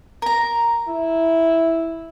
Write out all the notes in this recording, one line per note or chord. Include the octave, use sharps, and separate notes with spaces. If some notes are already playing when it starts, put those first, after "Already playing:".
A#4 A#5
E4